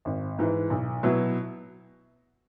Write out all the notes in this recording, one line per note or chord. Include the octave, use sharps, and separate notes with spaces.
G#1
G#2 E3
B1
B2 F#3 E4